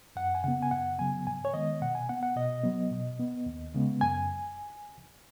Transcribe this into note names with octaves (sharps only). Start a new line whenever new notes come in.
F#2 F#5
G#5
C#3 B3 F#5
G#5
F#2 F#5
C#3 F#3 B3 G#5
G#2 G#5
C#5
D#3 G#3 B3 D#5
B2 F#5
G#5
B3 F#5
F#5
B2 D#5
F#3 B3
B2
B3
D#2
C#3 G#3 B3
F#2 G#5